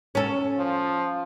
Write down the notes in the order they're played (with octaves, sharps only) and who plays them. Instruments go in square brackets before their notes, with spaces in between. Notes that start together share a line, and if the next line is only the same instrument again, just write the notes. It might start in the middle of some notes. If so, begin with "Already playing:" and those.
[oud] C#4 A4
[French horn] F3